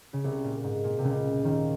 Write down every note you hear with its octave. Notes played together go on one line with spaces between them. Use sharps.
C#3
C2 C3
A#2
G#2
A#2
C3
C#2 C#3
D#2 D#3